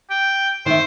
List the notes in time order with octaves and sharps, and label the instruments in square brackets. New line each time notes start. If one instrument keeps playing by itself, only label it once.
[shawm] G5
[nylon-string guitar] D#3 E5 [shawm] C5